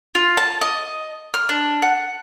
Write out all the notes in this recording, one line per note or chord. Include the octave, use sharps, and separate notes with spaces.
F4
A5
D#5
F6
D4
F#5